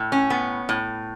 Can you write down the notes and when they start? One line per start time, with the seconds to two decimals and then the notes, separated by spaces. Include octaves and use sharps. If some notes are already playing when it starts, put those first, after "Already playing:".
Already playing: A2
0.12 C#4
0.30 B3
0.69 A2